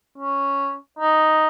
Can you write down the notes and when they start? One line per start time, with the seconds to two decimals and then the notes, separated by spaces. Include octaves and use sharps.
0.18 C#4
0.99 D#4